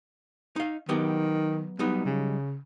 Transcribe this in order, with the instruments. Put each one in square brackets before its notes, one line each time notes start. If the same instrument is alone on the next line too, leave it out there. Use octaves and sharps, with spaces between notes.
[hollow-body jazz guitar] D#4 F5
[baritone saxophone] D#3 [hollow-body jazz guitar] F#3 B3 G4
[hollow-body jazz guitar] F#3 G3 D#4 [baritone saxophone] B3
[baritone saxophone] C#3